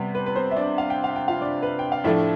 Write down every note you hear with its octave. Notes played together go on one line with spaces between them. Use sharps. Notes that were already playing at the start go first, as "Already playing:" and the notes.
Already playing: C3 G3 B3
B4
B4
C4 C5
E5
D4 D5
F5
G5
F5
G5
F4 F5
D4 D5
B4
G5
F5
A2 F3 A3 D4 E4 E5